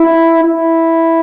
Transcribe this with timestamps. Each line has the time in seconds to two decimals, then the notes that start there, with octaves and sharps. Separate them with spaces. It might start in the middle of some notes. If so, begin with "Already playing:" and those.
Already playing: E4
0.44 E4